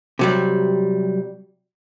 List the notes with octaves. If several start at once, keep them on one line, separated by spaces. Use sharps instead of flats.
C3 F#3 G3